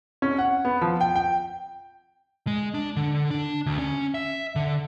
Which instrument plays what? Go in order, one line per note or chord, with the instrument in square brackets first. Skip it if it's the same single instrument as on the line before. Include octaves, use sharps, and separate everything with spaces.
[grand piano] C#4
F#5
B3
F3
G5
G5
[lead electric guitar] G#3
D4
D3
D4
D2
C#4
E5
D3